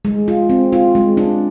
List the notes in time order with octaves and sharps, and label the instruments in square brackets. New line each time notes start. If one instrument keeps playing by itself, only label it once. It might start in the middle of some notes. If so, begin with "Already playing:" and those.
[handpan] G#3
F4
C4
F4
G#3
D4